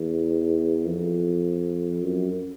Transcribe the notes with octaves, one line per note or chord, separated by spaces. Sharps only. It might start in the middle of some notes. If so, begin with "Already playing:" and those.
Already playing: E2
F2
F#2